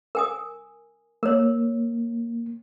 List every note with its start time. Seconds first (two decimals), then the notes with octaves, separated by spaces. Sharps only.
0.15 A#4 G#5 D#6
1.23 A#3 A#4 C#5